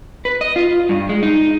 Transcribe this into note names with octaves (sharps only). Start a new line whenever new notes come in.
B4
D#5
F4
G2
G#3
D#4